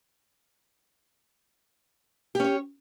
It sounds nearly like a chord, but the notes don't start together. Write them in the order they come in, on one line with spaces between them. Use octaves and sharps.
G4 C#4 C#5